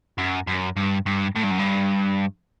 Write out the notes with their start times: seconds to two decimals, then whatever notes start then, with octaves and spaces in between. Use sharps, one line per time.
0.18 F#2
0.48 F#2
0.77 G2
1.06 G2
1.36 A2
1.44 G2
1.51 F#2
1.59 G2